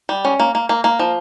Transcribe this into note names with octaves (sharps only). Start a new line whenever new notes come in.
G3
C#4
A#3
A#3
A#3
A#3
F3